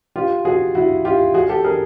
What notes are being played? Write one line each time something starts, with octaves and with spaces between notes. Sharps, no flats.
F4 G4
F#4 G#4
E4 F#4
F4 G4
F#4 G#4
G4 A4
G#4 A#4